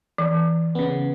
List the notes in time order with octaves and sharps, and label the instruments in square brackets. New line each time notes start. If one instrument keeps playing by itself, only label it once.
[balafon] E3
[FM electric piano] C#3 B3